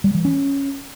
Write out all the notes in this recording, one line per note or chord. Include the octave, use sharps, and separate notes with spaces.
G3
E3
C#4